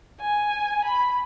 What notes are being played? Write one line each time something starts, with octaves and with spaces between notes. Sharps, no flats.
G#5
B5